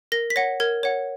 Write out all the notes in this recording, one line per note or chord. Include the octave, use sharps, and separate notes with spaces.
A#4 A#6
B6
C#5 F#5 A#6
A#4 G#6
C#5 F#5